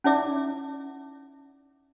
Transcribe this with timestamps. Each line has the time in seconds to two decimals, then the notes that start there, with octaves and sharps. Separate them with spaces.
0.04 C#4 D#4 E4 D5 E5 D6